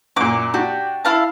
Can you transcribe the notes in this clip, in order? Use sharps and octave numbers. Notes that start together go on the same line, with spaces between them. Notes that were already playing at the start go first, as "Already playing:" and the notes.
F#2 A#2 D6
D4 F#4 G4
E4 F5 A5